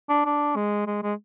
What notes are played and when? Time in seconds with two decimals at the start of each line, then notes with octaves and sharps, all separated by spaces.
0.09 D4
0.25 D4
0.56 G#3
0.86 G#3
1.03 G#3